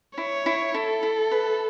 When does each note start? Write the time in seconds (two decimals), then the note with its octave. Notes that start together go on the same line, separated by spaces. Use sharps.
0.18 E4 C#5
0.46 E4
0.74 E4 A4
1.03 E4
1.31 B4